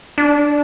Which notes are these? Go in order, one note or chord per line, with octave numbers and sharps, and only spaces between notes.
D4